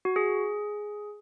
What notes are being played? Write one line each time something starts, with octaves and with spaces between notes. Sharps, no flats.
F#4
G#4